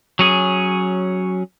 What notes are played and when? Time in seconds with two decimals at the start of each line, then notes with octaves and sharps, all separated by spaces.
0.19 F#3 C#4 G#4